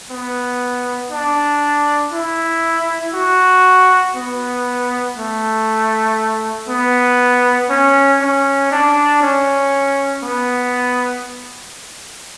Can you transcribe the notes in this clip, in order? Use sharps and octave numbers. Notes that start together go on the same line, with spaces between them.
B3
D4
E4
F#4
B3
A3
B3
C#4
C#4
D4
C#4
B3